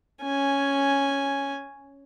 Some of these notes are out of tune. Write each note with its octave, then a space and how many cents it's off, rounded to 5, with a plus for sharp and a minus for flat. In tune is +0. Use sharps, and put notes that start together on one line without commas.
C#4 +0 G#5 +0